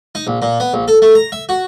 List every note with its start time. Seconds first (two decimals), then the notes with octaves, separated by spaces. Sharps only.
0.15 D#4
0.27 A#1
0.42 A#2
0.60 B3
0.74 A#1
0.88 A4
1.02 A3
1.15 A#5
1.32 E5
1.49 F#4